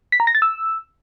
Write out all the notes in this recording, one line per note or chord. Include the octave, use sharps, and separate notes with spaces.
B6
A#5
A#6
A6
E6